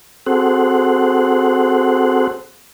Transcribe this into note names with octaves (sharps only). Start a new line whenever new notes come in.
C4 F#4 G#4 A4 C5 F#5